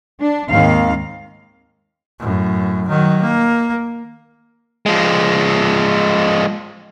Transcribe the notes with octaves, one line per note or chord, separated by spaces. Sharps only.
D4
D#2 G#2 C4 F5
F#2 A2
D#3 F#3
A#3
F3 G#3